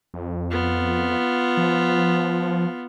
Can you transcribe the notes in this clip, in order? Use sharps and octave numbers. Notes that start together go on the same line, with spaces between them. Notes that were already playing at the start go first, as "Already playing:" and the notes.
F2
B3 F4
F3